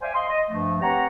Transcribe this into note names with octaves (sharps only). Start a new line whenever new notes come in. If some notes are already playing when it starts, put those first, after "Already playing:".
C5 D5 E5 F5 G5 G#5
D#5 F5 C6
D#5
G2 F3 A3
C4 G4 B4 C#5 F#5 A#5